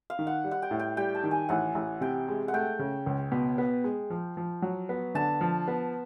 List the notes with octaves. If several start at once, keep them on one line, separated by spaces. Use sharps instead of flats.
F5
D#3
F#5
G3
F#5
G5
A2
G5
G3 G5
A5
D#3
G#5
A1 F#5
A1
C3 G5
G#3
F#5
A3 G5
C#3
C#2
B2
B3
G#3
F3
F3
F#3
B3
D3 A5
F3
B3